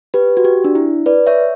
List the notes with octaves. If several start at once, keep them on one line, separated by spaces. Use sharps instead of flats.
G4 B4
F#4
G4
D4
E4
B4 D5
C#5 E5